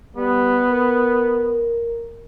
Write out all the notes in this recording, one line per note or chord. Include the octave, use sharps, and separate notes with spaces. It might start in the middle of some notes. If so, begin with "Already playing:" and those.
G3 B3
A#4